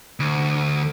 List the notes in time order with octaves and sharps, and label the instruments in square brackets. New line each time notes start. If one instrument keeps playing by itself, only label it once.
[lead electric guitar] D2